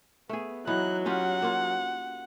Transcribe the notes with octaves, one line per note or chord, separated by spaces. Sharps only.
A3 B3 G#4
E3 F#3 B3 D#4 F#6
C#4 F4 G4 F#5
A#3 F4